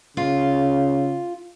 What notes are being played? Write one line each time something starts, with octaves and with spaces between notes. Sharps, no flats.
C#3 F4